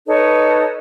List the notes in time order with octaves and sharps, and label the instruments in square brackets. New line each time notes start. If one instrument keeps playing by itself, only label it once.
[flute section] D#4 A4 B4 C#5